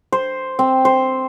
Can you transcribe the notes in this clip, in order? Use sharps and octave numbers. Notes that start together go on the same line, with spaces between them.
C5
C4
C5